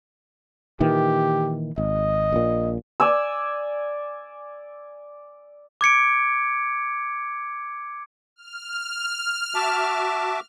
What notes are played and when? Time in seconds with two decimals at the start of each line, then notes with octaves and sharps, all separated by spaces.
0.80 A#2 D#3 E3 G4
1.78 G#1 D#5
2.33 A#1 A#2
3.00 D5 G#5 E6
5.81 D6 G#6 C#7 D7
8.36 F6
9.55 F#4 E5 A5 D6